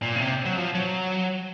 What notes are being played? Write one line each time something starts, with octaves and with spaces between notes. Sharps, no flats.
A#2
C#3
C3
F#3
F3
F#3